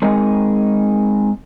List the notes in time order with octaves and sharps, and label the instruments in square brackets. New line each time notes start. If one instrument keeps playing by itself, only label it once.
[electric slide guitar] G#3 C4 D#4 G#4 A#4 C#5